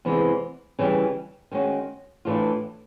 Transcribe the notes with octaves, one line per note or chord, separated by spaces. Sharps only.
E2 C3 E3 G#3
C#3 E3 G3
D#3 G#3 C#4 F#4
A2 E3 A3 D4 F4